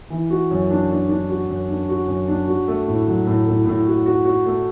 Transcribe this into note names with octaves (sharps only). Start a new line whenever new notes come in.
E3
F#4
F#2
D4
D4
D4
F#4
F#2
D4
F#4
F#2
D4
F#4
A3
A2
F#3
A2
A2
A2
F#4
F#4
F#4
A3